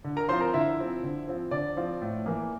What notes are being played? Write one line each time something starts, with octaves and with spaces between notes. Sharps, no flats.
D3
A#4 A#5
F3 C4 F4 C5 C6
A#4 A#5
D3 E4 E5
F3 C4 F4
D3
F3 C4 F4
D3 D5
F3 C4 F4
A2
E3 A#3